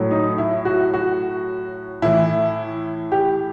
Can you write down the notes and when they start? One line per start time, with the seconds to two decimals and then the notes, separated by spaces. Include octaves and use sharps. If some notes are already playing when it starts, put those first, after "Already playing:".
Already playing: A2 F#3
0.11 D#4
0.38 E4
0.65 F#4
0.93 F#4
2.02 A2 E3 E4
3.12 G4